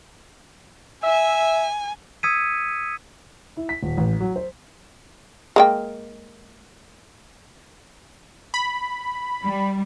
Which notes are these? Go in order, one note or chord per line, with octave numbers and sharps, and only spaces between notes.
E5 G#5
D#6 E6 G#6 B6 C#7 D#7
E4
B6
D#1
A1
F#3
C5
G#3 A#3 G5
B5
G3